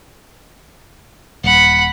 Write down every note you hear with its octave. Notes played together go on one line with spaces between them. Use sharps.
D#1 F#5 B5